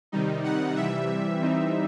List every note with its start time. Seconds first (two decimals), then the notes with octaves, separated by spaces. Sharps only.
0.12 C3 D#3 G3 D#4
0.44 F#5
0.76 C3 E3 G3 E5
1.40 E3 G3 C4 D#4